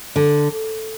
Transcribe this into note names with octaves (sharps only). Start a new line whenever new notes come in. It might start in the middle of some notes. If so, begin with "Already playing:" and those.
D3